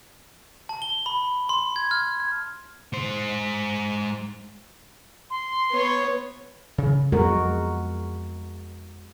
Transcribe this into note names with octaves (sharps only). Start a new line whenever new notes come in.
A5
G7
B5
C6
G#6
F6
G#6
G#3 C5
C6
B3 C#5
C#3
F2 F#3 G#3 B3 F#4 A#4